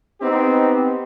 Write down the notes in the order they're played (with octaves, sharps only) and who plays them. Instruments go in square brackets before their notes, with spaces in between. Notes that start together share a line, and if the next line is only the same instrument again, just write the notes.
[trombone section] B3 C4 D#4 G4